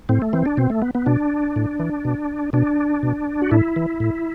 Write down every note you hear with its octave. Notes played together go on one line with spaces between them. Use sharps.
A2 C4
A3
E3 C4
D4
B2 C4
A3
B3
B3
B2 D4
A2
E3
B2
B2 D4
B2
F#4
A2 E4
E3
A2